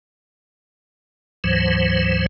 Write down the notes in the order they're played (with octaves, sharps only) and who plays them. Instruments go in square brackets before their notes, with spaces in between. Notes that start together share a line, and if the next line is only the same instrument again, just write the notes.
[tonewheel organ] D2 G#2 E3 F#3 C5